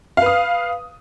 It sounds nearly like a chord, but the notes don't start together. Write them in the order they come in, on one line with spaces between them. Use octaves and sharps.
F5 B4 D#6